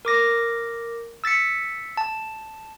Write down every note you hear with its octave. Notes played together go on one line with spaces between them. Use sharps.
A#4 D6 A#6
E6 A6 B6 C#7
A5